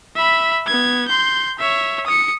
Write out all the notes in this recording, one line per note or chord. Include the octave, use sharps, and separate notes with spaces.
E5 B5
B3 G#6
C6 G6
C#5 E5
D#6 C#7